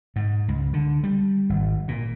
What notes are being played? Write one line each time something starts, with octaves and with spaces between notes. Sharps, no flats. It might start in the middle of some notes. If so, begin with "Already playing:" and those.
G#2
C#2
D3
G3
G#1
A#2